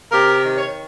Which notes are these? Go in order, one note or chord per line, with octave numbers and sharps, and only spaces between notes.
C3 G4 A#4
D#3
C#5